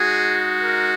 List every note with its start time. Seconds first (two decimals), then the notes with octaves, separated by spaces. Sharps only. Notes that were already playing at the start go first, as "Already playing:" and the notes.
Already playing: G#3 D#4 F#4 G#4
0.63 A#4